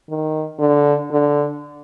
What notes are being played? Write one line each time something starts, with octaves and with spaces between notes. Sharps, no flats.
D#3
D3
D3